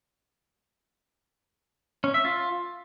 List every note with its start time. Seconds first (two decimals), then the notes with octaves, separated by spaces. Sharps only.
2.04 C#4
2.14 E5
2.25 F4